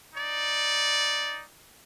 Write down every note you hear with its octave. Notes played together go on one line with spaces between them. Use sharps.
D#4 D5